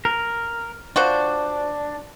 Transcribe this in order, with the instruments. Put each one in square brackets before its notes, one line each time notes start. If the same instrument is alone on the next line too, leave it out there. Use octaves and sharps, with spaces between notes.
[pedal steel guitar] A#4
[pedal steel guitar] D4 [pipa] F4 F#4 C5